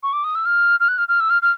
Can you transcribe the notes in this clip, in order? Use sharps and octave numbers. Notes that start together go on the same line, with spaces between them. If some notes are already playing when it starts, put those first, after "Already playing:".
C#6
D6
D#6
E6
F6
F6
F#6
F6
F6
E6
F6
F6